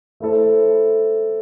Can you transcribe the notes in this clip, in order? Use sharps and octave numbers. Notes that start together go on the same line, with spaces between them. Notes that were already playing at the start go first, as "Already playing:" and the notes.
A3 E4 A4 C5